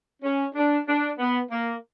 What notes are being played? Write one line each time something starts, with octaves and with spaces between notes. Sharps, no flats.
C#4
D4
D4
B3
A#3